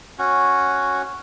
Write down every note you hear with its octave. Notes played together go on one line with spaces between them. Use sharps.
C#4 F#4